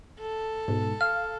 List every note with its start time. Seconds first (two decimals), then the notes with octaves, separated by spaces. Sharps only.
0.20 A4
0.68 G#2 B2
1.01 F5 F6